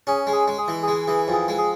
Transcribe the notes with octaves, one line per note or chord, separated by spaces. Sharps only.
C#4 G#4
G#3
G#4
G#3
G#4
E3
G#3 G#4
E3 G#4
F2
G#4
G#3
G#4